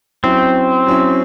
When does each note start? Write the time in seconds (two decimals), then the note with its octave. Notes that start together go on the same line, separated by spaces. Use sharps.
0.23 F#3 C4 C#4 E4
0.87 F#3 C#4 E4